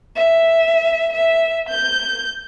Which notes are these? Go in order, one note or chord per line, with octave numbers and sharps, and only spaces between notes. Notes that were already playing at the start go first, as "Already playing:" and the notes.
E5
E5
G6